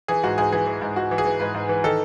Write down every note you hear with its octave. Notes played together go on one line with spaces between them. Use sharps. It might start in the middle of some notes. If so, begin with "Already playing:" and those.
E3 G#4
G#2 F#4
G#2 G#4
E3 G#4
E3
G#2
G#2 F#4
E3
G#4
E3
G#2 B4
G#2
E3
D#3 A4